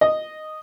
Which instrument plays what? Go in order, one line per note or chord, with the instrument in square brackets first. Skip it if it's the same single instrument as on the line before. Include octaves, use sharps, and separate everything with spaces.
[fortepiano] D#5